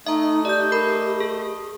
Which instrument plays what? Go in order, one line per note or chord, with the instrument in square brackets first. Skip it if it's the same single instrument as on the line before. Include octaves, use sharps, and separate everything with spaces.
[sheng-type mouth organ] A3 D#5 [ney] D#4 [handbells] E5 A#5
[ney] G4 [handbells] D5 G6
[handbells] A#4 B5
G#4